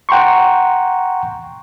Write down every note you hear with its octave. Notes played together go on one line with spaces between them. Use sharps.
F#5 G5 A#5 C6 C#6